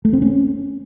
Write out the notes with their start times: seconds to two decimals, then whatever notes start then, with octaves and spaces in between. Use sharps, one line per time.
0.05 A3
0.13 C4
0.22 C#4